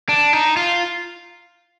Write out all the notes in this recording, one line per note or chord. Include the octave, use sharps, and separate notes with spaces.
D4
D#4
F4